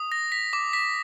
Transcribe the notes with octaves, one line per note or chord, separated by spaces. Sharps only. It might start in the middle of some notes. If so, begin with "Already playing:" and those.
Already playing: D#6
A#6
B6
D6
B6